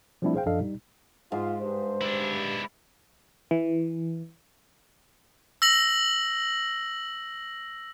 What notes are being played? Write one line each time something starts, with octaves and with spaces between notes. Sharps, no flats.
F3 G3 A3 C4 D4 E4
G#4 C5 F5 G5
F#2 F3 D4 A4 D#5 F5
G3 D#4
G#2 F4
G2 C5
D4 E4
E3
E6 A#6 F#7